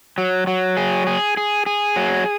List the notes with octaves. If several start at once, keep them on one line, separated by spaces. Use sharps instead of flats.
F#3
F#3
G#4
G#4
G#4
G#4
F#3